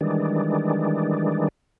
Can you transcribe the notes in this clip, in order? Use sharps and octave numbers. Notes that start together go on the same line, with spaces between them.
D#3 E3 G3 G#3 D4